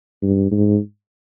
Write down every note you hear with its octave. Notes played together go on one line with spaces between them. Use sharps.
G2
G#2